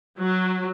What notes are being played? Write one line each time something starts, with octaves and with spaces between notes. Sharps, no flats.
F#3